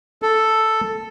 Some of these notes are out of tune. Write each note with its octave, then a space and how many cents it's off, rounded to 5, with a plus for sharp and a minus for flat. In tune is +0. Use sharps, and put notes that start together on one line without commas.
A4 +0